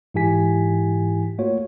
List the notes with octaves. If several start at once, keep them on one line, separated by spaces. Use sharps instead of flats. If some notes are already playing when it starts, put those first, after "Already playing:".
G#2 E3 E4 G4 G#5 B6
A3 A#3 F4 F#4 C#5